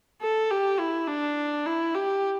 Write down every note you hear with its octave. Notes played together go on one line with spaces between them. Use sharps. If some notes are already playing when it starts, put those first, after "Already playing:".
A4
G4
E4
D4
E4
G4